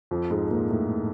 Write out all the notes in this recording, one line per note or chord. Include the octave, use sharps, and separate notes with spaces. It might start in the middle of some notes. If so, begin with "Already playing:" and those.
F2 F3
G#2 G#3
A#2 A#3
A2 A3